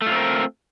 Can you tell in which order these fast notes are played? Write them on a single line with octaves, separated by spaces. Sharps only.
A3 F4 C4 A#4